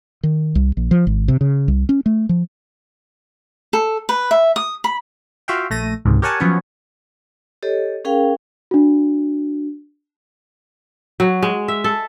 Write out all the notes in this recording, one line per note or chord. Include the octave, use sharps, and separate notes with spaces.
D#3
C2
A#1
F3
G#1
C3
C#3
C2
C#4
A3
F3
A4
B4
E5
D#6
B5
F4 F#4 E5 F5 G5
A#1 A3 A#6 D#7
C#2 G#2 C3 D#3
G4 A#4 C#5 F#5 G#5 A5
F3 F#3 B3 C#4 C#5
G4 A4 C#5 D#5
C#4 G#4 A#4 F5 G5
D4 F#4
F#3
G#3
E5
A4